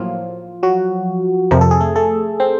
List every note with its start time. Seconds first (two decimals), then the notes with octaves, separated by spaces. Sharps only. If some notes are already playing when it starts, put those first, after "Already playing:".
Already playing: A2 F3 F#3 A#3 F4
0.63 F#3 F#4
1.51 F2 C3 F3 A#4
1.61 A4
1.71 G#4
1.81 A3 A4
1.96 A3 A4
2.40 C4 C5